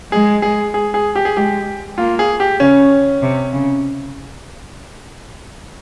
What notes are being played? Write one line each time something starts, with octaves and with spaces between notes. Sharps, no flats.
G#3 G#4
G#4
G#4
G#4
G4
G#4
G#3 G4
A#3 F4
G#4
G4
C#3 C#4
C3
C#3